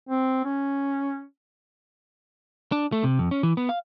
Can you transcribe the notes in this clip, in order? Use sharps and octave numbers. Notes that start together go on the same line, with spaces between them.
C4
C#4
D4
A3
C3
F2
C#4
E3
B3
F5